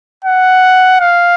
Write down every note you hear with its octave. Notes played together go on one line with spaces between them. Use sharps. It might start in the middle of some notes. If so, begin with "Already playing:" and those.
F#5
F5